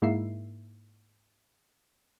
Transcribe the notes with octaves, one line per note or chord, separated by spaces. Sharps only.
G#2 A#3 E4 E5 C7